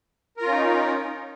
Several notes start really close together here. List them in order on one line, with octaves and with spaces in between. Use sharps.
A#4 F4 C#4 D#4